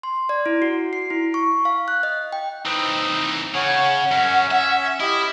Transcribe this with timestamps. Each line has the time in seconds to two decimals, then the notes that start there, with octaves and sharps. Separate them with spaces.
0.03 C6
0.29 D5
0.46 E4
0.62 F#4
0.93 C7
1.10 E4
1.34 C#6
1.65 F5
1.88 F#6
2.03 D#5
2.33 G5
2.66 E3 C4 D#4
3.54 C#3 C#5 F#5
4.12 F#2 C#4
4.51 E5
5.01 E4 G4 D#5